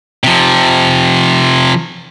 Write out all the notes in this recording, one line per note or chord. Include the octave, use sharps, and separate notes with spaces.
C3 F3